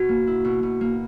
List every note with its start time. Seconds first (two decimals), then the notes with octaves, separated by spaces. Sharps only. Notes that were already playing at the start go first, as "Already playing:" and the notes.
Already playing: B2 F#4
0.09 A#3
0.27 E4
0.45 B2
0.63 B2
0.81 A#3